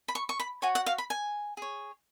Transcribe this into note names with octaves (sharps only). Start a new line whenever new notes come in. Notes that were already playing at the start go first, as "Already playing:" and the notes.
B5
C#6
C#6
B5
F#4 C#5 G#5
F#5
F5
B5
G#5
G#4 C#5